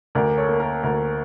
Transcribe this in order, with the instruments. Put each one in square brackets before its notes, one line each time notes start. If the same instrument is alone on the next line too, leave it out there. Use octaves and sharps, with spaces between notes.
[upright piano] D2 A#4 D5
A4 C#5
A#3
A#4
D2 A#4